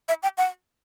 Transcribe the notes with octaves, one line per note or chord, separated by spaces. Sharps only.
E5
G5
F#5